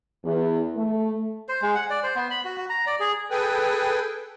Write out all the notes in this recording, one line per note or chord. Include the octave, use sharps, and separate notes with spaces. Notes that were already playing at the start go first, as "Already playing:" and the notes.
E2
A3
C5
G#3
F#5
D5
C5
B3
B5
F#4
F#4
A#5
D5
G#4
G#4 A4 B4 G5 G#5